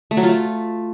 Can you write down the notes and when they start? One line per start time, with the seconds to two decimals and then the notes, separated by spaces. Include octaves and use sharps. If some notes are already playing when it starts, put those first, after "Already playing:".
0.11 A3
0.17 F#3
0.23 F4
0.29 A3